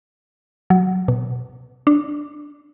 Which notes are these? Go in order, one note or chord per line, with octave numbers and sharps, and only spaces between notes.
F#3
B2
D4